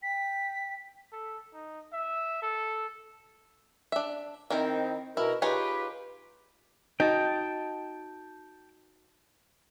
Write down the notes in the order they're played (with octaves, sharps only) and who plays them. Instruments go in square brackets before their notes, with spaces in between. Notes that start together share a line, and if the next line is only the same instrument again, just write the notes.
[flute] G5 [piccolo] B6
[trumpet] A4
D#4
E5
A4
[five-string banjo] D4 E5
[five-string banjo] D#3 E4 A#4 [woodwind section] C4 D#4
[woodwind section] B2 A#4 [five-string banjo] E4
[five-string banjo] D#4 G#4 C#5 [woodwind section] F4 G4 B4
[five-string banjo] D#4 F#4 [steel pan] D#5 [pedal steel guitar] G5 A5